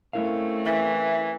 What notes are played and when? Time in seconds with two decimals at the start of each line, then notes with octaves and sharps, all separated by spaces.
0.13 A3 C4 C#4 E4 A#4 F5
0.65 E3 E5